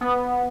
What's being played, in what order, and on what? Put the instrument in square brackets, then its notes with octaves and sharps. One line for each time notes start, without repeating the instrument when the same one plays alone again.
[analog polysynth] B3